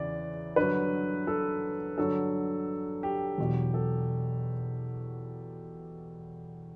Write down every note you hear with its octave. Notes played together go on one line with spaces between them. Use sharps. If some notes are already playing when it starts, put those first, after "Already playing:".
Already playing: E2 C#3 E3 D5
G2 D3 F#3 B4
A4
G2 D3 F#3 A4
G4
E2 B2 F#3
A4